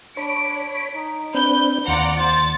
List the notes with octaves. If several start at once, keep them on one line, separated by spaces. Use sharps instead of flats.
D4 C#5 B5 D7
D#4
C4 D4 B4 G6
D#2 F4 D5 F#5 A#5
C5 A6